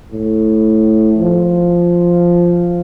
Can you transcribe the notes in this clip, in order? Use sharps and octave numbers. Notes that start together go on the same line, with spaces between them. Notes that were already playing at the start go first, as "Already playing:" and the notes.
A2
F3